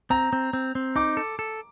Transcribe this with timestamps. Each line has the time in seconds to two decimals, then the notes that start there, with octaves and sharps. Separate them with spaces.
0.10 C4 A#5
0.33 C4
0.53 C4
0.75 C4
0.96 D#4 D6
1.17 A4
1.39 A4